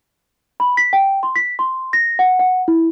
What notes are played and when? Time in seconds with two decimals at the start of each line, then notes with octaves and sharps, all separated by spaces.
0.60 B5
0.77 B6
0.93 G5
1.23 C6
1.36 B6
1.59 C6
1.93 A#6
2.19 F#5
2.39 F#5
2.68 E4